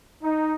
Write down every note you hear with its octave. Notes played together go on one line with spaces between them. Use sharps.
D#4